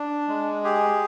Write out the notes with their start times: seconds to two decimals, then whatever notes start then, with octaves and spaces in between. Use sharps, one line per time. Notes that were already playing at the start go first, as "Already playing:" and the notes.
Already playing: D4
0.28 G#3
0.64 G4 G#4